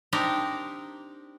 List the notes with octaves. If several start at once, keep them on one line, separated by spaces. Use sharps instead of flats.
C4 D4 D#4 G4 A#4